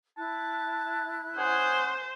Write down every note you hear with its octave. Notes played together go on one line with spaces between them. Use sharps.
E4 A5 F#6
C#4 G#4 C5 F#5 G#5